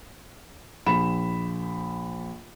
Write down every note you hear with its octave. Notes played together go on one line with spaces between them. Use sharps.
A#1 B5 E7